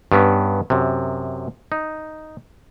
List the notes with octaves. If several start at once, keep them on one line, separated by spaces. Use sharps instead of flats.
G2 B3 C#4
F#2 C3
D#4